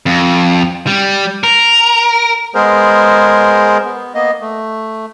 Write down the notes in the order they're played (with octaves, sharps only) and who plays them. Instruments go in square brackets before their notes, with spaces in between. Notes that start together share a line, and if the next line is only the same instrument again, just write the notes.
[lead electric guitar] F2
G3
A#4
[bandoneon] G#3 B3 G#4 A#4 C5
B3
A#3 B3 D#5
A3